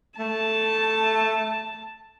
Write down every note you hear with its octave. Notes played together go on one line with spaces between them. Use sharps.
A3 A5